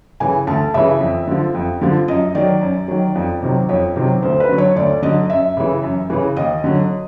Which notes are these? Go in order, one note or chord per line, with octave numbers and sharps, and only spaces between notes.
C#3 E3 G#5
D2 A5
C#3 E3 E5
F2
D3 F3
F2
D3 F3
F#2 D#5
D#3 F#3 D5
F#2
D#3 F#3
F2
C3 D#3 F#3
F2 C#5
C3 D#3 F#3
D2 C5
B4
D3 F#3
C#5
D2 D5
D3 F#3 D#5
F#2 E5
C#3 E3
F#2
C#3 E3
D#2 D#5
D3 F#3